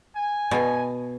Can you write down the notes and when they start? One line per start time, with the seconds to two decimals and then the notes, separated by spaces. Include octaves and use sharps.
0.16 G#5
0.51 B2